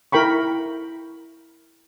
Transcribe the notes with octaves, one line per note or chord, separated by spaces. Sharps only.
E4 A#4 G5 B5 C#6